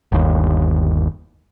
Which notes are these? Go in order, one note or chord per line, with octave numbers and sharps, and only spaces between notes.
G1 D#2